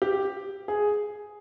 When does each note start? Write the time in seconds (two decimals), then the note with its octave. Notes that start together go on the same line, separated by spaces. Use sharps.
0.02 G4
0.68 G#4